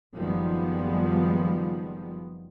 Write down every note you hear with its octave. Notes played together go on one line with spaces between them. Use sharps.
F#1 D#3 F3 G3 G#3 B3